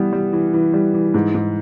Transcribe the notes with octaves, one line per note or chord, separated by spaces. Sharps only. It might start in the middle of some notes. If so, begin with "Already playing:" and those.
Already playing: E3 G3 B3
G3
E3
E3
G3
E3
G#2
G#2